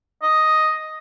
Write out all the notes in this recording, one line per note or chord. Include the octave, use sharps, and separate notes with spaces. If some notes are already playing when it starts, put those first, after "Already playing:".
D#5